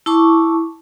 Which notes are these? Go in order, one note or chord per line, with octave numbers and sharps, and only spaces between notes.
E4 A5 C#6 D6